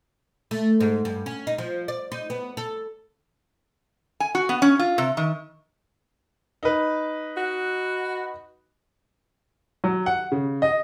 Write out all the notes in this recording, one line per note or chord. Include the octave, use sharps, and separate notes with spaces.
A3
G#2
G2
C#4
D#4
F3
D5
D#4
B3
A4
G#5
F#4
B3
C#4
F4
C3
D#3
D#4 B4
F#4
F#3
F#5
C#3
D#5